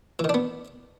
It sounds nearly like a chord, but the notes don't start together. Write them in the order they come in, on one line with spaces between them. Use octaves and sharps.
E3 D#3 D4 B3